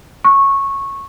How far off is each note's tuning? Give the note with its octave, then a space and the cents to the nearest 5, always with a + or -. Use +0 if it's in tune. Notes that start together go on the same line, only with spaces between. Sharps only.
C#6 -10